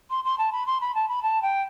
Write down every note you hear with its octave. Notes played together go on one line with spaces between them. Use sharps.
C6
C6
A5
B5
C6
B5
A5
B5
A5
G5